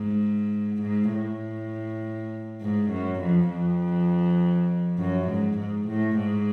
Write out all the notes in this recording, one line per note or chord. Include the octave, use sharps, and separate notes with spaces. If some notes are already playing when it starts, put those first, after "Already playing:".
Already playing: G#2
G#2
A2
G#2
F#2
F2
F2
F#2
G#2
G#2
A2
G#2